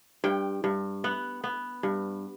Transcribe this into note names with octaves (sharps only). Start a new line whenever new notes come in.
G2 G5
G2
B3 F#5
B3
G2